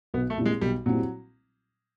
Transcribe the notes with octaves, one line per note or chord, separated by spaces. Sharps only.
B1 B3
A3
A#2 G3 C4 E4
G#3
B1 G3
A#2 F#3 G3 C4 E4